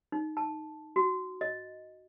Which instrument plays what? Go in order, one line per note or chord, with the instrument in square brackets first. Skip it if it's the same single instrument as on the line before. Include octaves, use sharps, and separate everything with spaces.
[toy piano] D#4
A5
F#4
D#5